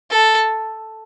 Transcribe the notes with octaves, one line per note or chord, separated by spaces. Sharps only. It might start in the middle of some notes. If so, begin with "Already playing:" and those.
A4